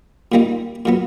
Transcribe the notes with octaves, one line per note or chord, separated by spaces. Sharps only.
A#2 G3 A#3 D#4
A#2 F#3 B3